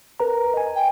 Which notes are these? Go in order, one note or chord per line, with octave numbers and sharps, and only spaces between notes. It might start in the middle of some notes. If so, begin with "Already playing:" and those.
A#4 B4 A#5
D#5 G#5
G5